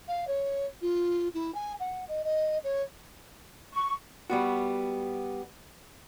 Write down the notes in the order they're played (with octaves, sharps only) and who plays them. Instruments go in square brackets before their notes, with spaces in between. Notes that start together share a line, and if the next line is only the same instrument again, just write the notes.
[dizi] F5
C#5
F4
E4
G#5
F#5
D#5
D#5
C#5
[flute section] C#6
[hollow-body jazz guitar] G3 B3 F#4